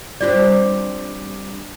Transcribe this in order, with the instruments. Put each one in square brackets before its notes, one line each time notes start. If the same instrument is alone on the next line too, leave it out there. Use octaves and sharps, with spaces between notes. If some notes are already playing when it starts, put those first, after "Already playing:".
[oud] G3 C4 D4 [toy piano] F4 D5